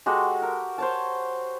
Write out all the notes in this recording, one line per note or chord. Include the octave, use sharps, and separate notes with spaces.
G#3 F#4 G4 A4
A#4
C5 C#5 A5